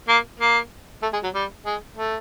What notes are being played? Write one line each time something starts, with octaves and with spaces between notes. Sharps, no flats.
A#3
A#3
A3
G#3
F#3
G3
G#3
A3